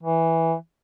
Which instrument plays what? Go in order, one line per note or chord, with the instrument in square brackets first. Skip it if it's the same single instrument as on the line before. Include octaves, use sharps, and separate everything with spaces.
[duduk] E3